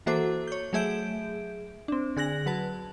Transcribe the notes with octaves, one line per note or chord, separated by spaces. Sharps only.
E3 A#3 F#4 A4 C5 D6
C#5 G6
F#3 A3 G#4 E5 G6 D7
C4 D4
D3 G#4 F#6 A#6 F#7
F#3 B4 A5